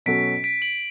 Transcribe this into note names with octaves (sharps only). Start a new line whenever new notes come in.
B2 F#3 C#4 F#4 A4 B6 D7
B6 D7
D7 F#7